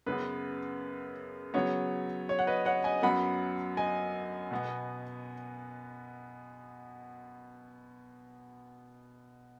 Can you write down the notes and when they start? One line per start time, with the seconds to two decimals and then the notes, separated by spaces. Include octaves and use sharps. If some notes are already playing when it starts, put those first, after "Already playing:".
0.06 F#2 C#3 B3 B4
1.54 C#3 F#3 B3 C#5
2.29 C#5
2.39 F#5
2.47 B4 D#5
2.65 C#5 F#5
2.84 D#5 G#5
3.02 F#2 F#3 B3 F#5 B5
3.77 D#5 G#5
4.51 B2 B3